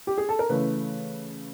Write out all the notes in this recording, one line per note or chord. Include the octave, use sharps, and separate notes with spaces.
G4
G#4
A4
A#4
C#3 E3 A3 B4